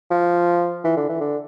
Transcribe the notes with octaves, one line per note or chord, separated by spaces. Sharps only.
F3
E3
D3
E3
D3